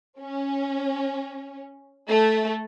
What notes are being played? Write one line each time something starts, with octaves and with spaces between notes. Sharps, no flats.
C#4
A3